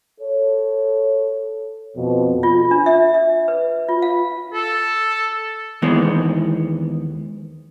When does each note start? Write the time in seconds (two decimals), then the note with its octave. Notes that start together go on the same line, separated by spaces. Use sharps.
0.21 A4 C#5
1.96 F2 B2
2.43 F4
2.71 D4
2.86 E5
3.14 E5
3.48 B4
3.89 F4
4.02 F5
4.53 A4
5.82 D#2 E3 G#3 B3